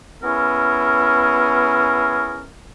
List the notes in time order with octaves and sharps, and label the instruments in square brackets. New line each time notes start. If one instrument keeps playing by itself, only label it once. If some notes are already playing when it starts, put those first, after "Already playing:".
[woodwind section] B3 C#4 E4 G#4 A#4